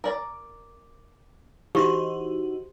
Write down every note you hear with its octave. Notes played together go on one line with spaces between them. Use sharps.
A#4 D5 A#5
E3 D#4 F#4 G4 C5